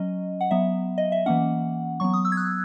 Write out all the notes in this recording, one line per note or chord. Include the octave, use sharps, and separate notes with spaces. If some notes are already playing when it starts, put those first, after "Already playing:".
Already playing: F#3 C#4 D#5
F#5
F#3 B3 E5
D#5
E5
E3 A#3 C#4 F#5
F#3 B3 C#6
D#6
E6
G#6
F#6